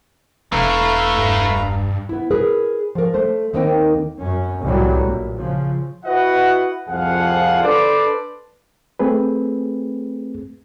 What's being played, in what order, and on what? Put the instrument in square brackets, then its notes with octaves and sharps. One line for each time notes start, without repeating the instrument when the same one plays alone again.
[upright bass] E1 [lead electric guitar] A3 E4 [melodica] B4 F5 A#5
[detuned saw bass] G2
[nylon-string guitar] B3 E4
G#4 A#4 B4
F3 A#4
A3 C5
D#2 D#3 A#3 C4 D#4 G5
[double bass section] F#2 C#4
C2 A2 E3 F#3 G3
A#1
C#3 F3
[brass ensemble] E4 F#4 B4 D#5 F#5
C2 F2 F3 G#4 F5 F#5
D4 A4 B4 C5 D5
[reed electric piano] A3 C4 G#4 B4